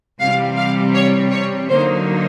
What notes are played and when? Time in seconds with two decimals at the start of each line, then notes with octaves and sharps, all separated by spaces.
0.19 C3 E3 G3 F5
0.56 F5
0.94 C#5
1.31 C#5
1.68 D3 F#3 A#3 D#4 C5